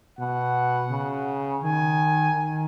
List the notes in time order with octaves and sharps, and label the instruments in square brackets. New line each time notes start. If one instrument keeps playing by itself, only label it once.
[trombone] B2 [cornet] F#5
[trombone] C#3
[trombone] D#3 [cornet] G#5
[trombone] D#3